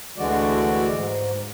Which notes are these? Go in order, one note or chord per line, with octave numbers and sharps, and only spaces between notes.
D2 D3 E3 G#3 F#4 D5
G#2